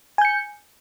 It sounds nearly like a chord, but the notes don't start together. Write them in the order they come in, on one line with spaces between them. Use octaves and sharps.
G#5 G6 C#7